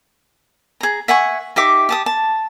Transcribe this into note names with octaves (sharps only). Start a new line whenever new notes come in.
G#4 A#5
E5 F#5 G#5 C#6
D#4 G4 E5 D6
G4 A5 D#6
A5